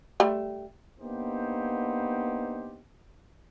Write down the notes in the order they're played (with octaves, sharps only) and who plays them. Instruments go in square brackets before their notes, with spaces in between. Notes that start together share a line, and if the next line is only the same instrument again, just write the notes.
[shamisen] G3 A3
[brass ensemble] A#3 B3 D4 D#4 G4 C5